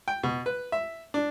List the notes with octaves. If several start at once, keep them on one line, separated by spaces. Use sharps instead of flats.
G5
B2
B4
E5
D4